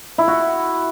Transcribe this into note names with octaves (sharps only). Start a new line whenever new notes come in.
E4
F#4